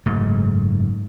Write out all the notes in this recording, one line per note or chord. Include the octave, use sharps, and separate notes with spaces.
F#1 G#2 A3